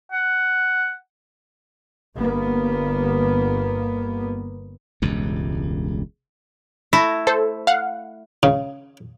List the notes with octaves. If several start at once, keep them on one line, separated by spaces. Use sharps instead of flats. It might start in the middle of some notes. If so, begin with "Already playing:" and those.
F#5
G1 A#3 B3
E1 C#2 G2
A3 E4 A#6
A4 C5
F5 F#5
C#3